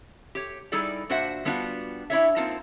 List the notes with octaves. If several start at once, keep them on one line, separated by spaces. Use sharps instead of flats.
G4 C#5
G3 D#4 E4 G#4 A4 D5
A#2 D4 F#4 C5 E5 F#5
G3 B3 D4 D#4 F4 F#4
D4 E4 C#5 E5
A#3 C4 D#4 F4 A5